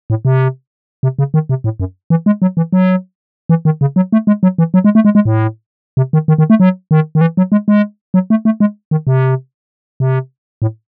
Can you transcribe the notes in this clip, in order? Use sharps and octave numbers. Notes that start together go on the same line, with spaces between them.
A2
C3
C3
C#3
D#3
C3
A2
F#2
E3
G#3
F#3
E3
F#3
E3
D#3
C#3
F#3
A3
G#3
F#3
E3
F#3
G#3
A3
G#3
G#3
A2
C3
D#3
D#3
D#3
A3
F#3
D#3
D#3
E3
F#3
G#3
G#3
F#3
A3
A3
G#3
D#3
C3
C3
A2